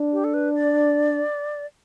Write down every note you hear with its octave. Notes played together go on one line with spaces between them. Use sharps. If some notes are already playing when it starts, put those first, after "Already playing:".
Already playing: D4
G4
A4
B4
D5